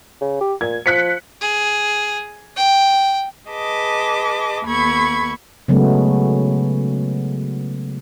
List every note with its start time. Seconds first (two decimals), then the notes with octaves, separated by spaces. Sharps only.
0.21 C#3
0.41 G4
0.61 A#2 G#6
0.86 F3 F#6 B6 C#7
1.41 G#4
2.56 G5
3.49 G#4 B4 D#5 A5 D6
4.65 D#2 B3 A4 B5 C#6 G#6
5.68 C#3 F#3 G#3 A3 B3